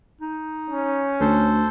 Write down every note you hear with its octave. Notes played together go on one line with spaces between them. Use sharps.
D#4
C#4
D2 A4 C5